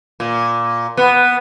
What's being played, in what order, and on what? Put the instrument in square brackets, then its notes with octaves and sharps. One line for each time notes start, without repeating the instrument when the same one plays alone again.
[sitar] A#2
B3